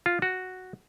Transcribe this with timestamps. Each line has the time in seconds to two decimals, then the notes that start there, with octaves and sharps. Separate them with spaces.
0.06 F4
0.22 F#4